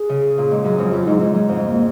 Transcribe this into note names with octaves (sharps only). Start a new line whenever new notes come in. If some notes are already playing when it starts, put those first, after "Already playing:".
Already playing: G#4
C#3
A#2
G#2
F#2
F2
F#2 F4
G#2 D#4
G#2 F3
G#2 F#3
F2 G#3
G#3
A#3